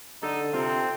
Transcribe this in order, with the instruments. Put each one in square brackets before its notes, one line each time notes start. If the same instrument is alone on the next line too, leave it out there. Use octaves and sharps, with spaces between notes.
[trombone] D3 [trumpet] D#4 [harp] A4
[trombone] C3 [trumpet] C4 [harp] F4